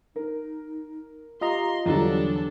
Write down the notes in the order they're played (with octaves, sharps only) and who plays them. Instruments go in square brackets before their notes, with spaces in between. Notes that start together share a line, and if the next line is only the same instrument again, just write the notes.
[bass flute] D#4 [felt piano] A#4
[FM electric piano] F4 D#5 A#5 [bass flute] G4 [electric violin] C6
[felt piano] E2 D3 F#3 [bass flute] G3 [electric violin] D4 A4